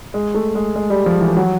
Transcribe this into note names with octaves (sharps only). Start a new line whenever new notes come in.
G#3
A3
G#3
G#3
G3
F3
E3
F#3